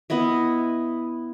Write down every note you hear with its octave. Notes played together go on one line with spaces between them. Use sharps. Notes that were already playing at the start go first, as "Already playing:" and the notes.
B3 E4 D#5 E5